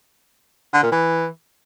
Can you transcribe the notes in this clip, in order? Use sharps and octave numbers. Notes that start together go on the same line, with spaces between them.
D3
A#2
E3